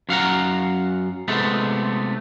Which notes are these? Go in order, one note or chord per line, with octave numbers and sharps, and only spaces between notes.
F#2 F5 F#5 A#5
C3 G#3 A3 B3